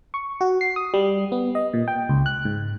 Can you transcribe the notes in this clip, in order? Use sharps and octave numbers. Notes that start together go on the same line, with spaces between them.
C#6
F#4
C7
D#6
G3
B3
D#5
A#2
G5
C#2
F#6
G#2